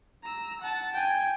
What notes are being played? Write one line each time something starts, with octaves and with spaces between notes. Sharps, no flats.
A#5 E6
F#5 A5
G5 G#5